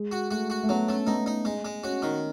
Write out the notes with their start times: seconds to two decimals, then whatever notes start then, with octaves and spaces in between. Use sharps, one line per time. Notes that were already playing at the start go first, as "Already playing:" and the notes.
Already playing: G#3
0.12 F#4
0.31 A3 F#4
0.50 F#4
0.63 A3
0.69 F#3 B3
0.87 A3 C#4
1.07 B3 D#4
1.26 D#4
1.45 G#3
1.65 G#3
1.84 C#4 F#4
2.02 D#3